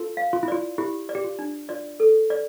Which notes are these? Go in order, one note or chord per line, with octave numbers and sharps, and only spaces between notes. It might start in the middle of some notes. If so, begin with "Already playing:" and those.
Already playing: F4 A4
F5
F4
E4
F4 D5
E4 G4
D5
G4
F4
D4
F4 D5
A4
D5